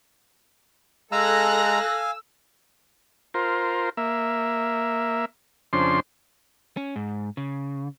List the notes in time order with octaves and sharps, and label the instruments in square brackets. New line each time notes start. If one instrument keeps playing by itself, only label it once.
[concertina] G#3 A#5 [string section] A4 F#6 A#6 [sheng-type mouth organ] F5 G#5 [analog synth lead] E6
[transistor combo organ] F4 A#4 C5
A#3 E5
F2 C#3 D4 C5 C6
[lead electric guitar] C#4
G#2
C#3